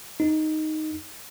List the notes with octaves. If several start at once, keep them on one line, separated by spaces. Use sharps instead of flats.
D#4